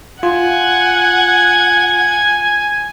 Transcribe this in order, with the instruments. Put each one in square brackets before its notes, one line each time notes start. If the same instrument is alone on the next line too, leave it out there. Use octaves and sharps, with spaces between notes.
[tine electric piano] F4 [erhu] F#5 [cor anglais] G#5 [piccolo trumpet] G#6